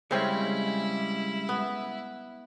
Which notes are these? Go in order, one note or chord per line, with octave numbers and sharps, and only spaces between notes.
C#3 G3 G#3 C4 C#4 E4
B3